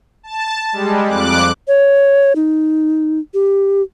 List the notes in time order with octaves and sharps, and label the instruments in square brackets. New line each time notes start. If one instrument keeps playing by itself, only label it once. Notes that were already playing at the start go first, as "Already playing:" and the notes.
[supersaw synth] A5
G3 G#3
F2 D6 F#6
[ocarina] C#5
D#4
G4